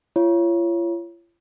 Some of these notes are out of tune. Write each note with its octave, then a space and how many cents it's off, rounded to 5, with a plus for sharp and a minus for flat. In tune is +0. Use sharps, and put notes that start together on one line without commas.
F4 -40 C#5 +0